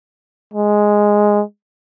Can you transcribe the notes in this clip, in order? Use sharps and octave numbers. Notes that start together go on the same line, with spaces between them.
G#3